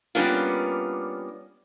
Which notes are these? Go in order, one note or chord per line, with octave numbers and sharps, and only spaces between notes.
G3 A#3 B3 C#4 D4 F4